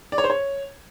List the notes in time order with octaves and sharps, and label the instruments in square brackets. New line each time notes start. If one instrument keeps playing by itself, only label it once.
[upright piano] D5
C#5
C5
C#5